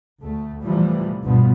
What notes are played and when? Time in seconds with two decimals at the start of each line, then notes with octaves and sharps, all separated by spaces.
0.22 D2 A3
0.64 A2 C3 E3 F3 G3
1.23 D2 G2 B2 F3 B3